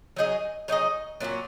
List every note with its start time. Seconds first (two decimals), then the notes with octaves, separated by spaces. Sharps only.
0.16 F#3 D#4 G#4 D#5
0.68 F#3 D#4 G#4 D#5
1.20 A#2 F#3 A#3 C#4